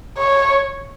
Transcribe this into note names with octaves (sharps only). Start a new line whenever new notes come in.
C#5